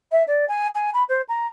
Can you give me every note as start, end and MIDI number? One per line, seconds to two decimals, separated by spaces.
0.11 0.23 76
0.27 0.45 74
0.48 0.67 80
0.75 0.90 80
0.93 1.03 83
1.08 1.21 72
1.28 1.47 82